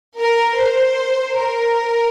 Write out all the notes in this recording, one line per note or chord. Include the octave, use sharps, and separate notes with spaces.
A#4
C5
A#4